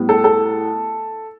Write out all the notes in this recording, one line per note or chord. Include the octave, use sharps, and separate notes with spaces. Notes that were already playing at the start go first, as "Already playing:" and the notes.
Already playing: A2 G3 B3
A4
A4